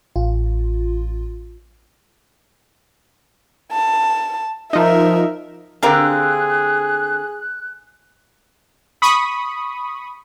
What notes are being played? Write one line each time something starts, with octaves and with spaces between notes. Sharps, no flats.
A1 F4
A5
F3 D#4 A#4 E5
D3 C4 G4 G#4 A#4 F5 F#6
B5 C#6 D#6